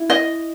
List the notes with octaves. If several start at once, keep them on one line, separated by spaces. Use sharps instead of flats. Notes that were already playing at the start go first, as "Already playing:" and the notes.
Already playing: E4
D#5